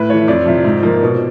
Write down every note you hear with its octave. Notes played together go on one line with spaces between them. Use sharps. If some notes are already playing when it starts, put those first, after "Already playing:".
Already playing: A2 B4
E3 A3 C#5
F2 D5
C3 F3
G#2
F3 A#3
B2